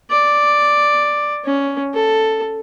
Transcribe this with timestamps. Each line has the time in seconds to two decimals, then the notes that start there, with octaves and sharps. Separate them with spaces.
0.11 D5
1.45 C#4
1.94 A4